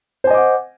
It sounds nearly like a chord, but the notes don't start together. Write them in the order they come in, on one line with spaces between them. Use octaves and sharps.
C5 G#5 D#5 D6 F#5